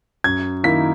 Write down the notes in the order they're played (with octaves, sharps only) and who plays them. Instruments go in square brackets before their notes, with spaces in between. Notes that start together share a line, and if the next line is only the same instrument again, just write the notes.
[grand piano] F#2 G#6
D#3 A#3 E4 B6